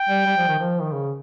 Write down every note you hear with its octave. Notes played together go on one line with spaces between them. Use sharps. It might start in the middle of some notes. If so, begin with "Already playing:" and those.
Already playing: G5
G3
G3
F3
D#3
F3
D#3
C#3